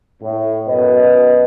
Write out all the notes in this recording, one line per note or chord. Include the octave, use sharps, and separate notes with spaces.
A2
F#2 B2 B4 D#5